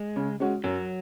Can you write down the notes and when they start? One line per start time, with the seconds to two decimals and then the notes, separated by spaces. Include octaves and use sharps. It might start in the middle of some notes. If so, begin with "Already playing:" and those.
Already playing: G#3
0.16 C#3
0.40 G#3 C#4 F#4
0.64 F#2 F#3